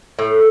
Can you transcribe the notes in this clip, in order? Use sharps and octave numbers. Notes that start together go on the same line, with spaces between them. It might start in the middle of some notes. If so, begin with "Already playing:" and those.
A2